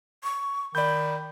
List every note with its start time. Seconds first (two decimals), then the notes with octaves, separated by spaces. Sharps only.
0.24 C#6
0.75 D#3 D5 B5 G6